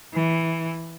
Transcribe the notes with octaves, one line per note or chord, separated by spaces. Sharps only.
E3